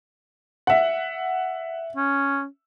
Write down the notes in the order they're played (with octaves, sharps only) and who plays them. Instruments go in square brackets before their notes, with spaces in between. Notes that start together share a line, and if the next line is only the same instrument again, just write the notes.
[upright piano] E5 F#5
[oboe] C#4